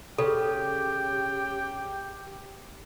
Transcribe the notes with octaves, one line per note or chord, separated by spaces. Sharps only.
C#3 G4 A4 G5